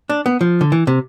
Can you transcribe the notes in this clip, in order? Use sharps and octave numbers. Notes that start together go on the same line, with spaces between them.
D4
B3
F3
D3
E3
C3